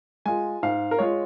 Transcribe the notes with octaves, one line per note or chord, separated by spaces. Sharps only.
G#3 F4 G#5
G#2 F5
A#4
G#3 F4 C#5